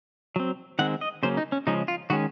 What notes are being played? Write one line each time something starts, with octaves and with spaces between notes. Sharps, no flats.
F#3 C4
D#3 G#3 C4 F#5
D#5
C#3 F#3 A#3 C#4 C5
D#4
C#4
C#3 F3 G#3 C#4 D#4
F4
D#3 G#3 C#4 F#4